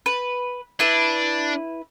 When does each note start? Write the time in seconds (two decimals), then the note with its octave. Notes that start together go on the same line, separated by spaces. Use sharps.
0.06 B4
0.80 D4 E4 B4